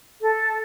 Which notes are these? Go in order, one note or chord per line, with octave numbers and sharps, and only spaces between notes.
A4